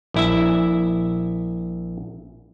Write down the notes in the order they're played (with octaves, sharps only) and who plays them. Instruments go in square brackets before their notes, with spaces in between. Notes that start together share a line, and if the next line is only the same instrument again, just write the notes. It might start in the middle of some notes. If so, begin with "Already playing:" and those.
[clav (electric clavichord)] A#1 E4 E5